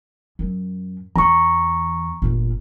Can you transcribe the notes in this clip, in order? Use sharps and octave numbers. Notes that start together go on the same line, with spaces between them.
F#2
E2 A#5 C#6
G1 A#2